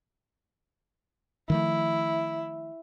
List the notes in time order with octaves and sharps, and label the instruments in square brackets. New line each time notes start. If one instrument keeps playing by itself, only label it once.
[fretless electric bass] D#3 F3 A3 [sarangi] E4